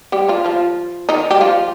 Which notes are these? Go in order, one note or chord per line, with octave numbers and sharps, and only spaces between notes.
G3 G4
F3 F4
F3 F4
D#3 D#4
G3 G4
F3 F4